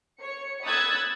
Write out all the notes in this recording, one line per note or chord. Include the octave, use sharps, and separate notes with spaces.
C#5 C#7
B5 D#6 E6 F#6 G#6 A6